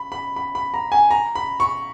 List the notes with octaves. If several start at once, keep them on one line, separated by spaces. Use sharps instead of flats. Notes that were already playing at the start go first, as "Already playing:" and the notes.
Already playing: B5
B5
B5
B5
A#5
G#5
A#5
B5
C#6